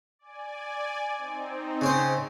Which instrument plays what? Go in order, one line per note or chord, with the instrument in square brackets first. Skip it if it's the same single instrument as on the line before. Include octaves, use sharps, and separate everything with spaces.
[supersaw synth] D5 G#5
C4 D#4
[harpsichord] C#3 C#4 C5